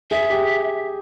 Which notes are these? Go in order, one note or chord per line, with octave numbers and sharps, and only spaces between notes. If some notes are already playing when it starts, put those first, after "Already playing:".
G#4 E5
G4